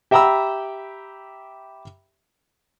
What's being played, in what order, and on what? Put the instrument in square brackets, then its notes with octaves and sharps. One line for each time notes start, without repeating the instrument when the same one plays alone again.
[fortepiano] G4 E5 G5 A#5 B5 E6